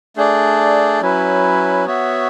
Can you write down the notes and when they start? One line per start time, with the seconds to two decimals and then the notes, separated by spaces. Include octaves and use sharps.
0.16 A3 D4 G#4 D5
1.01 F#3 C#4 E4 B4
1.86 B3 F#4 C#5 E5